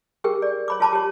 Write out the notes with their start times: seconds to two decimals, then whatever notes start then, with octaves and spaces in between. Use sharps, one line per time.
0.24 G4 G#4 A#4 G5
0.42 D5
0.68 C#5 B5 D6
0.80 F4 C#5 A5 B5 D6
0.93 G4 C#5